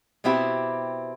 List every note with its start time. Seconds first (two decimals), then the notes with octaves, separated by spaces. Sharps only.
0.24 B2 B3 C4 E4 G4